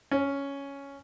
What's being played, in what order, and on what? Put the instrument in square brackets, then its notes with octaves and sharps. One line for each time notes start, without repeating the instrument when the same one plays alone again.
[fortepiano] C#4